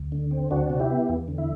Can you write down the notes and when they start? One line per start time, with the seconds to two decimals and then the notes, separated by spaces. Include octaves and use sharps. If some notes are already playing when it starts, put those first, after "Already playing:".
Already playing: D2
0.12 D3
0.31 C4
0.51 D2 D4 F#4
0.70 C3
0.80 E4 G4
0.90 B3
1.09 E2
1.28 D3
1.38 E4